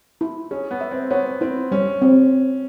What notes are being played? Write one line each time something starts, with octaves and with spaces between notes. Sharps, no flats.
E4
C#4 G#4
B3
E5
C4
B3 C#5
C4 E4
G3 C#4
C4